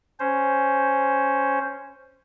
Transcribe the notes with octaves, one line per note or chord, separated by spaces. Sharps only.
C#4 C5